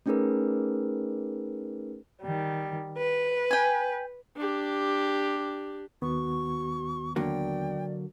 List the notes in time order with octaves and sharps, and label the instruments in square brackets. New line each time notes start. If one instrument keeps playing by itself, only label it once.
[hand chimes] A3 C#4 D#4 G#4 A#4 B4
[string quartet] D#3 G3
B4
[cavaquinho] G5 G#5
[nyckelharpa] D4 G4
[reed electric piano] D#2 D#3 B3 [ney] F#4 [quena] C#6
[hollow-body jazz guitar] D3 F#3 A#3 [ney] D5 [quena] G5